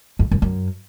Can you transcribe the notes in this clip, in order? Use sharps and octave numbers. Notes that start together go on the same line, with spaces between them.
F2
F#2
F#2